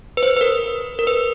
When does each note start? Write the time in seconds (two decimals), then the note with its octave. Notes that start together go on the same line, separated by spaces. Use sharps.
0.17 B4
0.23 C5
0.37 B4
0.41 A#4
0.99 A#4
1.07 B4